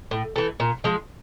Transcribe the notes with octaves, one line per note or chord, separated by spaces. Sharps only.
A2
E3 A3
A#2
F3 G#3